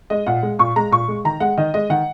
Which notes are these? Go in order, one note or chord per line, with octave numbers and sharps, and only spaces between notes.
G#3 D#5
A#2 F#5
G#3
A#2 C#6
G#3 A#5
A#2 C#6
G#3
D#3 A#5
G#3 F#5
D#3 D#5
G#3 D#5
D#3 F#5